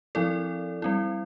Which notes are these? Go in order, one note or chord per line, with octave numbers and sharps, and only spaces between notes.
F3 C4 E4 A4 D5
G3 C4 E4